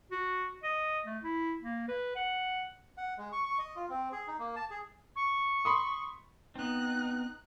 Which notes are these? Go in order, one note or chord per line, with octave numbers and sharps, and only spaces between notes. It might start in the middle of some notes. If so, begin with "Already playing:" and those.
F#4
D#5
A3
E4
A#3
B4
F#5
F#5
G#3
C#6
C#6
D#5
F4
C4
G#4
D#4
A#3
A5
G#4
C#6
B5 C6 D#6
B3 C4 D#4 F#6